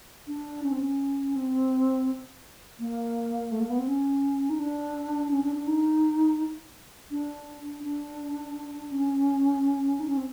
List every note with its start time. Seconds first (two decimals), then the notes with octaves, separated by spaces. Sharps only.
0.27 D4
0.63 C#4
0.71 C4
0.79 C#4
1.35 C4
2.79 A#3
3.51 A3
3.60 A#3
3.69 B3
3.78 C4
3.87 C#4
4.49 D#4
4.59 D4
5.31 C#4
5.43 D4
5.55 D4
5.67 D#4
7.11 D4
7.83 D4
8.91 C#4
9.99 D#4
10.08 C#4
10.17 C4